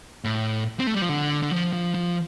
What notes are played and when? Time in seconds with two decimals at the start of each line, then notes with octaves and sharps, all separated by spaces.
0.24 A2
0.80 C4
0.87 A3
0.94 G3
1.02 F3
1.09 D3
1.43 D3
1.51 F3
1.73 F3
1.94 F3